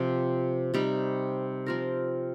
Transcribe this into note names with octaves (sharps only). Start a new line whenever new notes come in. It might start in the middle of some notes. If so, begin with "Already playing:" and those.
Already playing: C3 F3 C4
C3 G3 D#4
F3 C4 F4 A#4